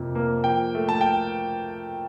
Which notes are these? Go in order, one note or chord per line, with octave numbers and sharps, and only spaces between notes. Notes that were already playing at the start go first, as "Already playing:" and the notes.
Already playing: F2 C3 F3 A#3
A#3
F3 G5
A3
A5
G5